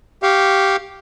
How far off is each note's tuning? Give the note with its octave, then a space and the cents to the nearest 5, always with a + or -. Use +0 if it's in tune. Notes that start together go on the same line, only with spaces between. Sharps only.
G4 -5 F5 +0 C#6 +0